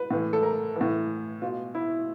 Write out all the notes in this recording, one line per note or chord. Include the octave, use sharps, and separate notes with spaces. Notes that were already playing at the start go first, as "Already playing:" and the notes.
Already playing: B4
A2 E3
A4
A#4
E3
A2
B2 F4
E4